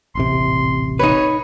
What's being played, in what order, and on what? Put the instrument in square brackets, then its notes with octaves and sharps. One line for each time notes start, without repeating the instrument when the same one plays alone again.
[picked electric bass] D#1 A1 C3 [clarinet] C6
[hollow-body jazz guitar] D#4 B4 [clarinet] C#5